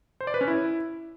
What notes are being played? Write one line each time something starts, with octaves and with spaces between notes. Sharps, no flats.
C5
D5
B4
C#4
E4